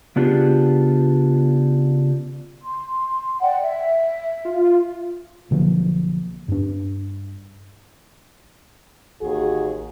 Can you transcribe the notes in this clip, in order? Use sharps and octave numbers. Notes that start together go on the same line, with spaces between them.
C#3 B3 D4 F4 G4 G#4
C6
D5 F#5 G5
E5
F4
B1 D3 F3 A#3
G2 D4
A1 D#2 F#4 G#4